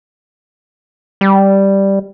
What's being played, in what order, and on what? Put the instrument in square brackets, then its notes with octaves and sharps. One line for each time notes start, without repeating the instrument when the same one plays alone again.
[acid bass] G3